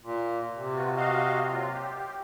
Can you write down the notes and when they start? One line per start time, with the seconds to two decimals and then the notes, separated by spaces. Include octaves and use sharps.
0.04 A#2
0.54 C3
0.74 B3 F4 F#4
0.96 F#4 D#5 F5
1.50 A#2 F#3 F4
1.71 G4